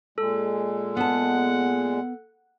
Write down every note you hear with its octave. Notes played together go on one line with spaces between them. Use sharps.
A#2 G#3 A4
B3 F#5 A5